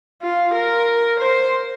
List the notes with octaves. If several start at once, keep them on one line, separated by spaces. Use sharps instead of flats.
F4
A#4
C5